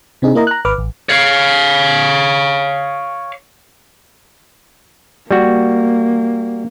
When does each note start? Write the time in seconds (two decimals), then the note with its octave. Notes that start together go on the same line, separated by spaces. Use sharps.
0.22 C3 C4 D4 D#4 G#4
0.35 A#3 E4 A#4 D#5 A#5
0.47 A#5 F#6
0.65 G#1 B4 D6 F6
0.78 A1
1.09 C#5 F5
5.31 G3 A#3 F#4